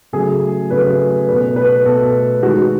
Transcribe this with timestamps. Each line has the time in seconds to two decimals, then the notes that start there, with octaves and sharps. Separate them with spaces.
0.13 C#3 F#3 A3 G#4
0.70 C#3 F#3 A3 B4
1.28 B2 A3 B4
1.56 B4
1.85 B2 A3 A4
2.42 D#3 G#3 F#4